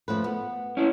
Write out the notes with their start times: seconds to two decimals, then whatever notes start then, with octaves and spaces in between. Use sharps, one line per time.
0.08 F3 A3 B4
0.24 B3
0.77 C#4 E4